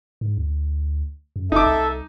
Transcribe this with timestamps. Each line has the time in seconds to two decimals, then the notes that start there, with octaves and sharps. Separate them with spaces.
0.21 G#2
0.37 D2
1.36 F#2
1.52 F#1 D#4 A4 E5 D6
1.66 C2